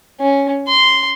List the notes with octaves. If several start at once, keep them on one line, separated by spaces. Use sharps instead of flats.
C#4
C6